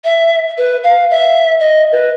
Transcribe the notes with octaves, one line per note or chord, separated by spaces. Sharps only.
E5
B4
F5
E5
D#5
B4